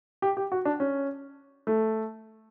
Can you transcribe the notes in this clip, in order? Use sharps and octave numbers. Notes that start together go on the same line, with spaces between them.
G4
G4
F#4
D4
C#4
A3